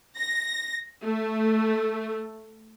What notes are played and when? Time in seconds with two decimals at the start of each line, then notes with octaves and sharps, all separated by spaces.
0.17 A#6
1.02 A3